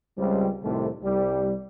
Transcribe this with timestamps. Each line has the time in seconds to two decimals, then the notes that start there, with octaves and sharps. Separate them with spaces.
0.18 C#2 G3 C4
0.63 C2 F2 A2 C3 D#3 A3
1.04 C2 G3